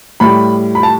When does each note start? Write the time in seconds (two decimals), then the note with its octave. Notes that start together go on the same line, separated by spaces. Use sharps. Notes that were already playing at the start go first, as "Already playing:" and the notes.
0.20 A2 G3 B5
0.75 B5
0.83 A5